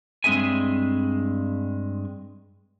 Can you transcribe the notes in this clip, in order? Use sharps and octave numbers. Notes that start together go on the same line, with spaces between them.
G2 G#3 C4 G#4 E5 G#5